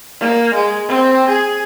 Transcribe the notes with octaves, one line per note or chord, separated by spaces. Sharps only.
A#3
G#3
C4
G#4